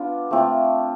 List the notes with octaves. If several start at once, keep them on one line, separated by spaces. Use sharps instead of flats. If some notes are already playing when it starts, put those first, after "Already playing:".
Already playing: B3 D4 F4
A3 C4 F4